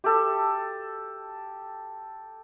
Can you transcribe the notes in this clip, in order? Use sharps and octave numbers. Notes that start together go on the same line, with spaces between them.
G4 A4